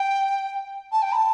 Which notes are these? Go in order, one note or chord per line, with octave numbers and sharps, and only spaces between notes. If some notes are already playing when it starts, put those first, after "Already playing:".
Already playing: G5
A5
G5
B5
A5